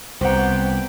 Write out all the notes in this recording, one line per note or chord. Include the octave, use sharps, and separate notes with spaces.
C2 B3 G4 C5 F#5 G5 A#5